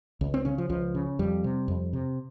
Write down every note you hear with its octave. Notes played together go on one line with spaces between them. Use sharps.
C#2
C4
C#3 C#4
F3
C#2 F3
C#3
F2 G3
C3
F2
C3